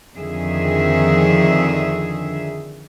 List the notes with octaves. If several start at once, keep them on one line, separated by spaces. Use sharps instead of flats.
F2 D3 D#3 G#4 E5